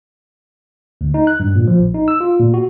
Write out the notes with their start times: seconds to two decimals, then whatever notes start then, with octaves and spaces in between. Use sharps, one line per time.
1.01 D2
1.14 D#4
1.27 F#6
1.40 G2
1.56 A#2
1.67 F3
1.79 A#1
1.94 D#4
2.08 E6
2.21 F4
2.40 A#2
2.54 F#4